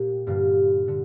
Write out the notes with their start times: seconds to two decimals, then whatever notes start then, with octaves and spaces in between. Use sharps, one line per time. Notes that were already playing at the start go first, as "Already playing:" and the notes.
Already playing: A#2 A#3 G4
0.27 G2 D3 G3 A#3 F4
0.86 D3 G3